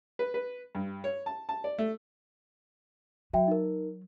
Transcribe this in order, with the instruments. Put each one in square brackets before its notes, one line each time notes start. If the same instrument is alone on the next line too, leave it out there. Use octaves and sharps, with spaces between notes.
[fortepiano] B4
B4
G2
C#5
A5
A5
D5
A3
[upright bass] F#3 [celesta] F#4 E5 G5
[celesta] D#4 A#4